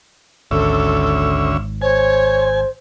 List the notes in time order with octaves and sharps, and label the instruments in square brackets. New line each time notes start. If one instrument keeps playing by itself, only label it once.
[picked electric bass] G#1 [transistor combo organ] D2 C#4 E5 [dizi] A4
[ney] C5 [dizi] C#5 [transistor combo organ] G#5